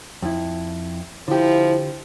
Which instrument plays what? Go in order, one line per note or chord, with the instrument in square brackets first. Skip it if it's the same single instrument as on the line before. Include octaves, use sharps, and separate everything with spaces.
[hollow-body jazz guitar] F2 E4
[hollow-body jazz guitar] D3 G4 [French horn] F3 [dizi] E4